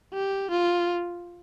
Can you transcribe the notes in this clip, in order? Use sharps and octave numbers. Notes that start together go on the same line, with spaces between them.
G4
F4